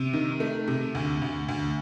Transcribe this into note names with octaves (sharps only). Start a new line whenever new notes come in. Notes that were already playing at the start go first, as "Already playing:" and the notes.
Already playing: C3
D#3
A3
C3
D2
D2
D2